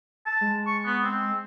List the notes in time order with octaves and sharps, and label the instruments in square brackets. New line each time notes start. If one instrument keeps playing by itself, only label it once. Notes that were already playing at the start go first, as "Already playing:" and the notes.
[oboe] A5
[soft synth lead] G#3
[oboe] C#6
B3
C4